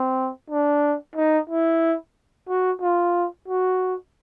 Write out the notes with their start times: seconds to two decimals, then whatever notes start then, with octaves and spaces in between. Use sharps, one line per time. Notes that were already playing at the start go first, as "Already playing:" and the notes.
Already playing: C4
0.50 D4
1.16 D#4
1.50 E4
2.48 F#4
2.81 F4
3.48 F#4